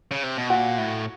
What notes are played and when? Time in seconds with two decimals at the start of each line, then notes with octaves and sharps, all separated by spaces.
0.11 C#3
0.23 C3
0.38 B2
0.50 A#2 F#4
0.78 A2